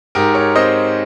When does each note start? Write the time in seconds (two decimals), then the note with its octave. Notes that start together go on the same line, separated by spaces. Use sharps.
0.15 G#2 G4 A#4
0.35 A#4 C#5
0.56 C4 C5 D#5